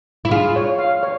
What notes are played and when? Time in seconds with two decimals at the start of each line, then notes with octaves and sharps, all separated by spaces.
0.25 E4
0.31 F4 G#4
0.56 C#5
0.79 F5
1.03 C#5